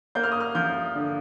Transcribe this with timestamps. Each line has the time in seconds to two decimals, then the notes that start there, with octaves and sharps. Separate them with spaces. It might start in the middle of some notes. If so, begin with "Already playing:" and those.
0.15 A#3 G6
0.23 F6
0.32 D#6
0.40 F6
0.55 F3 G6
0.95 D3